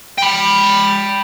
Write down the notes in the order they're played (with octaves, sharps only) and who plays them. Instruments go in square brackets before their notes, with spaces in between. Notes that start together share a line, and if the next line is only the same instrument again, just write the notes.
[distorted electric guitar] G5 B5